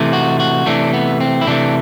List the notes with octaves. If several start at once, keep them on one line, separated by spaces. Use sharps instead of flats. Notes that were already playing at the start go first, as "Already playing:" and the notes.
Already playing: C3 E3 A3
F#4
F#4
C3 E3 A3 D4
B3
C4
E4
C3 E3 A3 D4